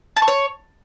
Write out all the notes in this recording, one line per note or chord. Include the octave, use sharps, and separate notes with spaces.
A5
C#6
C#5